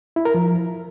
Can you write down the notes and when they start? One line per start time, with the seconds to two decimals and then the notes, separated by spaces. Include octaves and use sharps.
0.16 E4
0.25 A#4
0.34 F3